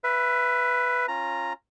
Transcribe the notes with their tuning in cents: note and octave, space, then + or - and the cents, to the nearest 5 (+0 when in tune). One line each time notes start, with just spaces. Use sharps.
B4 +0 E5 +25
C#4 -25 F4 +0 A#5 +0